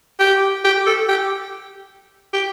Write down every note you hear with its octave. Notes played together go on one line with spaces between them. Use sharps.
G4
G4
A4
G4
G4